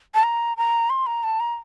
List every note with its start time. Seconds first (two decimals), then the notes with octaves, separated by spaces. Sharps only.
0.14 A5
0.23 A#5
0.57 A#5
0.90 C6
1.06 A#5
1.23 A5
1.40 A#5